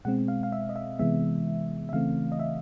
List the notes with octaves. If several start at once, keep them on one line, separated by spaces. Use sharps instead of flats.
B2 G#3 C4 F#5
F5
F5
E5
D#5
E5
C3 E3 G#3 B3 E5
E5
C#3 E3 A3 C4 F5
D#5
E5